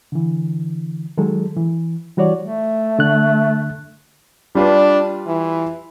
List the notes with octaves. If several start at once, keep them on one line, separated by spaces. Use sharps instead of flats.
D3 E3
D#3 F#3 G#3 A4
E3
E3 G3 F#4 C#5 D5
A3
D3 F#6
G3 D4 F4 B4
E3